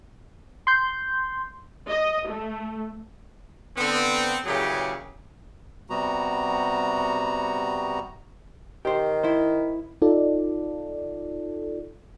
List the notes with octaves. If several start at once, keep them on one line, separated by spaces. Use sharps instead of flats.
C6 G6
D#5
A3
D3 B3 C4
A#2 C#3 E3 F#3 G4 G#4
C3 G3 B3 F#4 A#5
D#3 G4 C5
E4 C5
D#4 F4 A4 D5